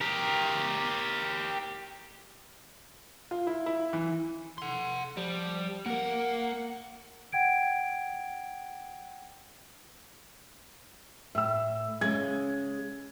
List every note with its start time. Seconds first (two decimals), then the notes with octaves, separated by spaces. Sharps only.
0.01 G4 A#4
3.31 F4
3.47 E4
3.66 E4
3.93 E3
4.58 F#5 C6
5.17 F3 G3
5.86 A#3 A#4 F#5
7.32 F#5 G5 G#6 D7
11.35 A2 E5 E6
12.01 C#3 G#3 G#6